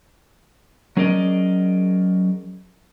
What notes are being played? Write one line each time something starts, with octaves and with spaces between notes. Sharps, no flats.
F#3 C#4 G#4 A#4 D5 D#5